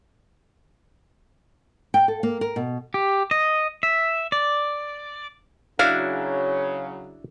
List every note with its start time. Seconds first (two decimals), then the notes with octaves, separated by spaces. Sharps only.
1.94 G5
2.08 A4
2.23 A#3
2.41 A#4
2.56 B2
2.94 G4
3.31 D#5
3.83 E5
4.32 D5
5.79 C#3 F#3 D4 E4 F#4 F5